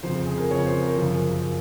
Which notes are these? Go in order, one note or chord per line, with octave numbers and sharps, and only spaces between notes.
F2 C#3 F3 C5
G#4
A#4
F2 C#3 F3 C#5
C5
A#4
F#2 C#3 F3